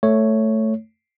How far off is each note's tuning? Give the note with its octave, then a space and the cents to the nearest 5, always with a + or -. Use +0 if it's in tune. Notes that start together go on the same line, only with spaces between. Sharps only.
A3 +0 C#5 +0